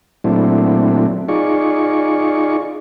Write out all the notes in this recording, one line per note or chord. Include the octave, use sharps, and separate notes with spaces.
A#2 F#3 A3 C4 D4 E4
D#4 F4 G#4 D5 C#6